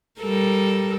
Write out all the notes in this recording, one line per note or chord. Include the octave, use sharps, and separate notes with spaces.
G3 A4 A#4